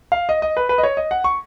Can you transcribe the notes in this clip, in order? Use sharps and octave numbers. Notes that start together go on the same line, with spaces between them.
F5
D#5
D#5
B4
B4
D#5
C#5
D#5
F#5
C#6